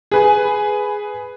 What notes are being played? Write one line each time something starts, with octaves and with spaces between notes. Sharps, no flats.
G#4 B4 G#5